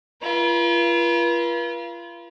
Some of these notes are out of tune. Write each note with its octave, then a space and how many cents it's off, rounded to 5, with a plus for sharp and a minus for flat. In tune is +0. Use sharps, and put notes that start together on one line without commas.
F4 -35 B4 -45